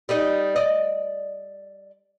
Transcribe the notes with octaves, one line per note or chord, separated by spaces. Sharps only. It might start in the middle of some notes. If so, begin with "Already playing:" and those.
G3 D#4 D#5
D5 D#5